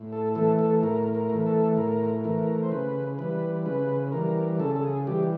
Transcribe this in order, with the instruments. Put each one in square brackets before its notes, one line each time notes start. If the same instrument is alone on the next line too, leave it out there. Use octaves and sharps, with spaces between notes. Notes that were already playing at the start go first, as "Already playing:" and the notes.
Already playing: [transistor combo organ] A2
A4
E3 A3 A4
A4
A2 A#4
A#4
E3 A3
A4
A2 A#4
E3 A3 A#4
C5
C#3 B4
E3 G3 B4
C#3 B4
E3 G3 A#4
C#3 A4
A4
G#4
E3 G3 G4